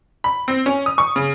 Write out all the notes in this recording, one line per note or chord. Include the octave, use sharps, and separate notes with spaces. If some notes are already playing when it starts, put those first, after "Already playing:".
B5
C4
C#4
D#6
C#6
C#3